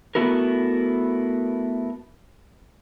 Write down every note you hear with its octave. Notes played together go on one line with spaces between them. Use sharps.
A3 B3 E4 F#4 A#4